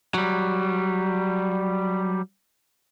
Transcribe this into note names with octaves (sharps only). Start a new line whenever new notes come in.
F#3 G3